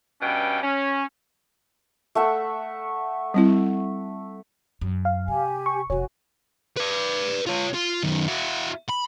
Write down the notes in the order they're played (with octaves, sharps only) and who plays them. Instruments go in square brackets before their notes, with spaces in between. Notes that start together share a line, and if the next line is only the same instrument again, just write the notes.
[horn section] G2 B2 C#4 G5
C#4
[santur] A3 E5 F#5
[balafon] G3 C4 E4
[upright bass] F#2
[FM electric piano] F5
[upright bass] C3 [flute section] G4 G#5
[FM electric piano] C#6
[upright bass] F1 C3 [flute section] F#4 G#5 [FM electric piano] C#5
[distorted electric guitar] B4 D5
F4 C#5
F4
F#2 D#3
E4 F#4
B5